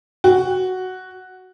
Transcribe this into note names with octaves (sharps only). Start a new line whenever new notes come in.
F#4